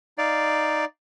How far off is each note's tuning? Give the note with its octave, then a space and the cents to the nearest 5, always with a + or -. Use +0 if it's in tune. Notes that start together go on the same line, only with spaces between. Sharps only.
D#4 +0 D5 +0 F5 -10